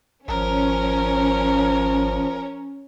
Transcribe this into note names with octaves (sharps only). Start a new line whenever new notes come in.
G#1 F3 C#4 A#4 C#5